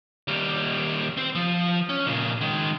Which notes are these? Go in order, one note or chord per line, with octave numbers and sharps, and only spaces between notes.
D#2 G3
C4 C5
F3
C#4
A#2 C#3
D#3 G#3